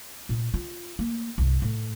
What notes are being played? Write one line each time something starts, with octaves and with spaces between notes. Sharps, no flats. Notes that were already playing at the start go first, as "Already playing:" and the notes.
A#2
F4
A#3
C2 G2
A2